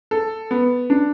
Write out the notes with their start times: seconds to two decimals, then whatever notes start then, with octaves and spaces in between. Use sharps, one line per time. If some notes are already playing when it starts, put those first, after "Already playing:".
0.11 A4
0.51 B3
0.90 D4